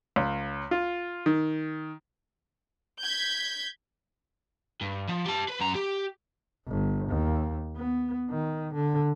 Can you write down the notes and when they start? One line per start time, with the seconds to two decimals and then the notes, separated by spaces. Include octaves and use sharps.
0.16 C#2
0.71 F4
1.26 D#3
3.02 G6 G#6 B6
4.81 G2
5.09 F3
5.26 G4 A5
5.48 B4
5.60 F#2 A#5
5.75 G4
6.68 G1
7.09 D#2
7.77 B3
8.30 D#3
8.74 D3